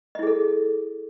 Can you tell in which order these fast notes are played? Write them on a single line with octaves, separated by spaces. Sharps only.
D#5 E4 G#4 A4